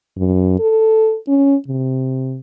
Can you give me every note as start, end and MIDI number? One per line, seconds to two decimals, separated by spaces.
0.17 0.56 42
0.59 1.16 69
1.28 1.56 61
1.68 2.39 48